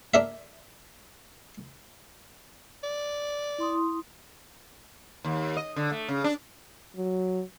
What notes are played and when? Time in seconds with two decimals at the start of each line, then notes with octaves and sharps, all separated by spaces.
0.14 D4 A#4 E5
2.83 D5
3.58 E4 C6 D#6
5.24 D#2
5.57 D#5
5.76 D3
5.92 A3
6.08 C#3
6.24 D4
6.96 F#3